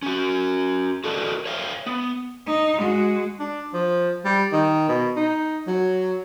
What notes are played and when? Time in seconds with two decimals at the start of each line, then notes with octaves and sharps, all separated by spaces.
0.02 C#4 F#4
1.04 F#4 A4 A#4 D5 D#5
1.46 C#5 E5 F5
1.86 B3
2.47 D#4
2.79 G#3 F#4
3.39 D4
3.74 F3
4.25 G3
4.52 D#3
4.89 B2
5.16 D#4
5.67 F#3